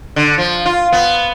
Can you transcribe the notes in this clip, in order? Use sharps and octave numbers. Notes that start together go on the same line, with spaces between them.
D3
F3
F4
B3